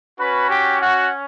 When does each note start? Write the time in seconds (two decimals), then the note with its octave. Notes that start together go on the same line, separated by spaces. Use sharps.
0.19 C#4 F#4 B4 B5
0.50 G4 G5
0.80 F#4 F#5